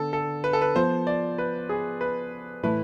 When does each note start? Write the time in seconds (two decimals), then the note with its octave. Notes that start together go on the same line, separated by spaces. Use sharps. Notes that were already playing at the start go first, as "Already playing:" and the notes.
Already playing: D3 B3 A4
0.13 A4
0.44 B4
0.53 A4
0.62 B4
0.75 F3 B3 F4 C5
1.07 D5
1.38 B4
1.69 G#4
2.01 B4
2.63 A2 E3 A3 E4 B4